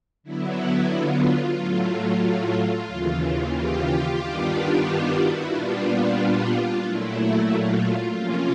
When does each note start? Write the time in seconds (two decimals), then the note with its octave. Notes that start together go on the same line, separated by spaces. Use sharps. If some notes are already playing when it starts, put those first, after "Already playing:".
0.23 D3 F#3 B3 E4
0.89 F4
1.55 A2 F#3 A3
2.86 D#2 C#3 E3
3.51 F4 G4
4.17 G2 D#3 G3 B3 D4
4.83 F4 G4
5.15 E4 F#4
5.48 A#2 G3 B3 D4 F4
6.80 A#2 F#3 A3 E4
7.46 F4
8.11 C3 F3 A#3 C#4 F4